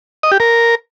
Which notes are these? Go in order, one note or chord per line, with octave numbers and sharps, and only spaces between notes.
D#5
G4
A#4